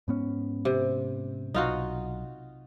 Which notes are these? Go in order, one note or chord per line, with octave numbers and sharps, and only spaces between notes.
G#2 B3 C#4
C3
B1 D#4 F4 F#4